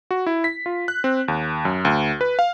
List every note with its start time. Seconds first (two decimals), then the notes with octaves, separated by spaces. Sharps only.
0.11 F#4
0.26 E4
0.44 B6
0.66 F4
0.88 F#6
1.04 C4
1.28 D#2
1.65 F#2
1.85 D2
2.21 B4
2.39 F5